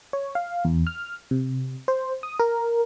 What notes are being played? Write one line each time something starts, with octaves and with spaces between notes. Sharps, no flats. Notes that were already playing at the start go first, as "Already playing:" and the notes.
C#5
F5
E2
F6
C3
C5
D#6
A#4